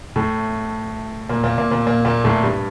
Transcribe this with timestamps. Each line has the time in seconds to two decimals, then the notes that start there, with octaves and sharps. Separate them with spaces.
0.16 A2 A3
1.29 A#2 A#3
1.44 A#2 A#3
1.58 A#2 A#3
1.71 A#2 A#3
1.87 A#2 A#3
2.05 A#2 A#3
2.24 A2 A3
2.43 G2 G3